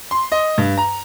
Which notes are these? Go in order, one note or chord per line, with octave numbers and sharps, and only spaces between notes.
C6
D#5
G2
A#5